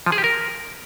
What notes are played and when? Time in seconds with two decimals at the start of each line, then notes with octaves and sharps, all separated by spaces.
0.06 F3
0.12 G#4
0.18 G4
0.24 A#4